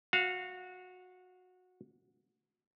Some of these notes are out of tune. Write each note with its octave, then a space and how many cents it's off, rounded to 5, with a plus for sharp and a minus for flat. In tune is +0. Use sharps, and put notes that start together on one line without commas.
F#4 -20 F5 +0